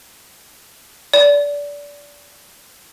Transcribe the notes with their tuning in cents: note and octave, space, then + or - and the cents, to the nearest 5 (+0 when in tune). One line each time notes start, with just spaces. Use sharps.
D5 -25